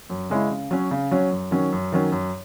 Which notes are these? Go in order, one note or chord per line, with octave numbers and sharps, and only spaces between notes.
F#2
C#3 G#3 C#4 E4
C#3
F#3 C#4
C#3
F#3 C#4
F#2
D#3 F#3 C#4
F#2
D#3 F#3 C#4
F#2